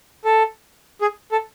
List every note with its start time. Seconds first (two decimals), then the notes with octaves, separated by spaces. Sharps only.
0.25 A4
1.01 G#4
1.32 A4